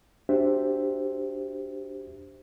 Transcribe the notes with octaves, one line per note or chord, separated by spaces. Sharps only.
D4 F#4 G4 C5 E5